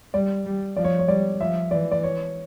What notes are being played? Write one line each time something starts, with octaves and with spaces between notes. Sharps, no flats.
G3 D5
G3
F3 D5
C#5
C#5
G3 D5
F3 E5
E3 D5
D5
C#5